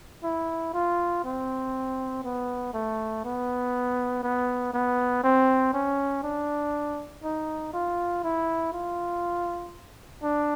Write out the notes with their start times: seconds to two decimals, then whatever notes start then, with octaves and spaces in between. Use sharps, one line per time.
0.23 E4
0.74 F4
1.24 C4
2.24 B3
2.74 A3
3.24 B3
4.23 B3
4.74 B3
5.24 C4
5.74 C#4
6.24 D4
7.24 D#4
7.73 F4
8.23 E4
8.73 F4
10.23 D4